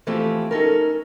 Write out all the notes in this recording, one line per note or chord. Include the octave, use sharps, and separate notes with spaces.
E3 F3 A3 C4 G4
C#4 D#4 A4 A#4